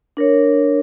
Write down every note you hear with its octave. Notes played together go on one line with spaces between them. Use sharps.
D4 A#4 C#5